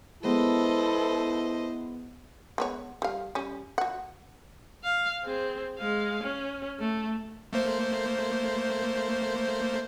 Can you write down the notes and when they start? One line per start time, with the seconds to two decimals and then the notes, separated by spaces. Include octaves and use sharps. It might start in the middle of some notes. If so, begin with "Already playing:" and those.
0.23 G#3 B3 E4 A4 B4 C5 D#5
2.58 G#3 B3 C#5
3.02 G3 F5
3.35 G3 C#4
3.78 F#4 F#5
4.84 F5
5.23 C4 G#4
5.78 G#3 F5
6.24 C#4
6.80 A3
7.53 A3 A#3 C5